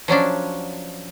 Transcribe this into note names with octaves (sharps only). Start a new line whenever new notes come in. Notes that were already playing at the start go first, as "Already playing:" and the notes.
F3 F#3 C#4 D4